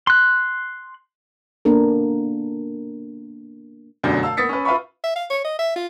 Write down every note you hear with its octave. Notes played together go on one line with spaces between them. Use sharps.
C6 F#6
A#3 B3 D4 A4 A#4
F1 F#2 B2 D3 D5 G6
F5 A5 E6
A#3 B3 D#6 A6 B6 C#7
C#4 B4
F4 B4 E5 F5 B5 C#6
E5
F5
C#5
D#5
E5
F4